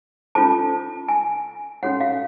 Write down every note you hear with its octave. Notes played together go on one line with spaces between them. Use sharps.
C#4 F4 A4 C5 A5
G#5
C#4 F#4 A4 C#5 F#5
F5